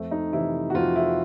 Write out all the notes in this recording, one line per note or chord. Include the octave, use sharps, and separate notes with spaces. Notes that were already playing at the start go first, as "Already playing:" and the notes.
Already playing: F2 A3
D#4
C3 E3 E4
F#4
F2 F4
E4